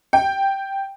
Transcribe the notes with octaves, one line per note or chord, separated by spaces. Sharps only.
G5